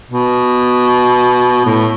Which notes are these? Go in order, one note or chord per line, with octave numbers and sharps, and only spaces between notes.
B2
A2